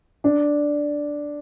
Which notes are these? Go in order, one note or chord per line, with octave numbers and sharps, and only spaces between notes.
D4